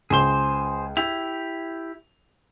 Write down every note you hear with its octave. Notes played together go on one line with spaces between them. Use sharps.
C#2 G#4 C5 G7
E4 G4 F7